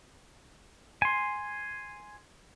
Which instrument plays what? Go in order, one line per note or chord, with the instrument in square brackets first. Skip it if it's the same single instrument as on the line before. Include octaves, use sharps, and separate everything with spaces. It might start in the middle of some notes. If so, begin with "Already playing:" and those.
[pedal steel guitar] G#5 C6